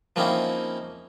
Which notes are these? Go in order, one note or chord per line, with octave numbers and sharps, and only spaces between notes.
F3 A#3 C4 C#4 D#4 E4